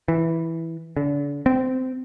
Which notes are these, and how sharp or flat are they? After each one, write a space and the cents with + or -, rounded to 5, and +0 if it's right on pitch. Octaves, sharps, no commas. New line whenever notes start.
E3 -5
D3 -35
C4 -20